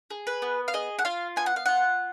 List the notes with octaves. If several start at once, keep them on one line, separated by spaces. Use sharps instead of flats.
G#4
B4
B3
F5
G#4 D#5
F#5
F4 F5
B3 G#5
F#5
F5
F4 F#5